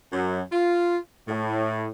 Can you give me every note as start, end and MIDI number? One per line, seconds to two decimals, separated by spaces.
0.13 0.42 42
0.52 0.98 65
1.28 1.88 45